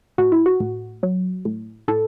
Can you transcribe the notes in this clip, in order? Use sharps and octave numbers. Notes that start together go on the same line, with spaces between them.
A2 F#4
E4
F#4
A2
F#3
A2
A2 A4